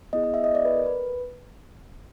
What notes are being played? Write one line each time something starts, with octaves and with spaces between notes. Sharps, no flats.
B3 E4 G#4 D#5
D#5
E5
D#5
D5
B4
A#4
B4